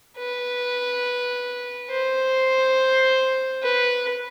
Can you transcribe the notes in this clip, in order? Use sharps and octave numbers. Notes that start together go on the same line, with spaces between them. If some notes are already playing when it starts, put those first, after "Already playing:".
B4
C5
B4